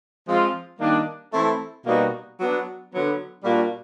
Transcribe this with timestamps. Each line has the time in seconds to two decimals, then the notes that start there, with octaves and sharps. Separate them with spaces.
0.27 F3 G#3 C4 F4
0.79 D#3 G3 A#3 D4
1.33 E3 A3 C4 E4 A4
1.85 B2 G3 A#3 D#4 F#4
2.38 F#3 B3 D4
2.92 D3 F#3 B3
3.44 A#2 G3 A#3 D4 F#4